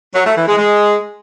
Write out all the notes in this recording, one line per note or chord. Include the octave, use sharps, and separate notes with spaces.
F#3
A3
E3
G#3
G#3